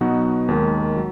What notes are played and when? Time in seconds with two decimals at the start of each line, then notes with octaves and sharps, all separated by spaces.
0.01 B2 F#3 B3 D#4 F#4
0.48 D#2 D#3 G#3
0.96 F#3